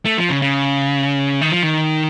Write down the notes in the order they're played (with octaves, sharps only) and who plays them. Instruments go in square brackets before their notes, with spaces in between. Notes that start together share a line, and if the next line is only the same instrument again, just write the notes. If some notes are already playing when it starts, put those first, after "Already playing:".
[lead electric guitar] A3
F3
C#3
C#3
D#3
F3
D#3